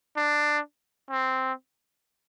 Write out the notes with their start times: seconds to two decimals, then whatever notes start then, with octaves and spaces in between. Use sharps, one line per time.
0.17 D4
1.10 C4